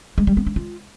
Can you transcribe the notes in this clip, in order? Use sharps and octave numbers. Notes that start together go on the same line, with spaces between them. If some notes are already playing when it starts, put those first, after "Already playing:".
G#3
G3
B3
D4
F4